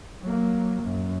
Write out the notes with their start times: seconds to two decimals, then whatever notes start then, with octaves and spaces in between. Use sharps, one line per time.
0.22 F#3 A#3
0.83 F#2